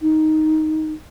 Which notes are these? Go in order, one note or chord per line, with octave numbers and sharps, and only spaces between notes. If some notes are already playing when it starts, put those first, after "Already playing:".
D#4